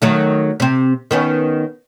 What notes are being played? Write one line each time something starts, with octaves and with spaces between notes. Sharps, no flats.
D#3 F#3 A3
C3 C4
D#3 B3 C#4